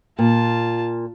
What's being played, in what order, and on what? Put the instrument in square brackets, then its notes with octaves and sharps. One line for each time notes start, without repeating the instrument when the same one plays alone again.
[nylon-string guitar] A#2 [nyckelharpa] F4 A5